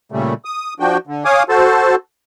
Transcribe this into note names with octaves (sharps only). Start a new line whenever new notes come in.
A#2 C#3 G3 A3
D#6
F3 D4 F#4 G5
D3
C#5 F5 G#5 D6 D#6
F#4 A4 C5 A5